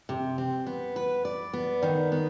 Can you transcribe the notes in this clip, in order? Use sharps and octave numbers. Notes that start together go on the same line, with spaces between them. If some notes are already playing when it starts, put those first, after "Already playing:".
C3
C4
B3
B4
D5
B3
D#3
B3